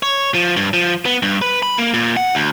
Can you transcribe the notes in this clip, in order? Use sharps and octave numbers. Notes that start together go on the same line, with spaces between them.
C#5
F3
G2
F3
B3
G2
B4
B5
A#3
A#2
F#5
D2